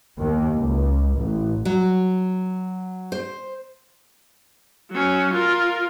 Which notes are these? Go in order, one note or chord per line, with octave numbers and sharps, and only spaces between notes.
D#2
C#2
A1
F#3
C5
F#3 C#4
F4 A#4